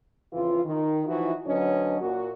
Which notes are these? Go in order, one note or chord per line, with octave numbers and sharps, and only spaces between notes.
F2 C#3 E3 F4
D#3
E3 F3 D#4 E4 F#4
D2 F#3 C#4 D4 B4 D#5
A#2 F#4